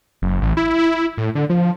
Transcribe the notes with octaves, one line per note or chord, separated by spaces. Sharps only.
F#1
A1
E4
E4
A2
D3
F3